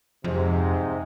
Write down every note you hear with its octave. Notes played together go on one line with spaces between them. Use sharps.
F2 G#2 C3